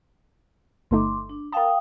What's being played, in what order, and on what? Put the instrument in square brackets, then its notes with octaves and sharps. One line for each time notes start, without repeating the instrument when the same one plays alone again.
[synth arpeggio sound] G1 A3 D#4 [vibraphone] C6 D6
[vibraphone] D4
[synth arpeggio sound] A#4 A5 [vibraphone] F5 G5 D#6